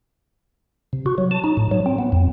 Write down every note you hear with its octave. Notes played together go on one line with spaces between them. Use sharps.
C3
F#4
F#3
A5
D#4
A2
F#3
C4
B3
F2